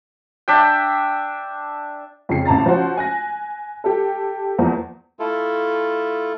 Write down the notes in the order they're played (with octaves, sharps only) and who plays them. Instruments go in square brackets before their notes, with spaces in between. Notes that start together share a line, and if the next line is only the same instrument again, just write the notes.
[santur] D4 E5 G5
[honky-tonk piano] F2 C#3 C7
A1 A5 A#5 A6
F3 C#4 F4 F#4 C5
G#5 F#6 A#6
G4 A4
E2 F3 A#3
[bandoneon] A3 E4 F4 A4